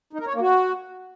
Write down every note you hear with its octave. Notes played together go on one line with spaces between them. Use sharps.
D#4
A#4
C#5
A#3
F#4